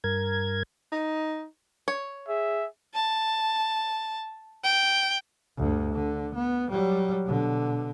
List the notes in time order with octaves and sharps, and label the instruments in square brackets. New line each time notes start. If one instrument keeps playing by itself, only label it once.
[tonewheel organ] G2 A#4 G#6
[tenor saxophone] D#4
[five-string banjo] C#5
[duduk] G#4 [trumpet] E5
[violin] A5
G5
[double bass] D2 G2
D3
B3
F#3 G3
B2 D3